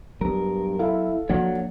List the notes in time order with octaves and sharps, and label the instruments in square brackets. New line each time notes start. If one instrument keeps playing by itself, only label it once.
[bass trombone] G2 [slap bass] F#3 B3 [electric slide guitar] A#4
[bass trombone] E4 [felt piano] A4 F5
[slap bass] F3 A#3 D4 [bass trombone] F#3 [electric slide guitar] C#5 D5 F#5